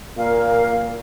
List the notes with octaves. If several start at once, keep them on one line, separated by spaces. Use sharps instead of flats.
A#2 A#4 F5